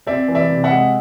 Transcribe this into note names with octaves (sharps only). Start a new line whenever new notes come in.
C4 D5 E5
E3
D5 E5
C3
E5 F#5
G#3